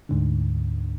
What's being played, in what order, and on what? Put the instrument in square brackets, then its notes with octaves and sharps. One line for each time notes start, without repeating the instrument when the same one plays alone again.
[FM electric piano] D2 G#2 D3